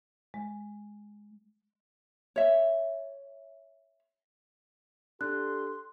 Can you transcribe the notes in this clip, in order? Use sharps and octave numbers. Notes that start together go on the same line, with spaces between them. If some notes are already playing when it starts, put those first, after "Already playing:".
G#3
C#5 E5
D4 G4 A4 C6 F#6